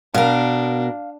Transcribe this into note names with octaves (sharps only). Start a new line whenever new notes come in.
B2 D4 A#4 F5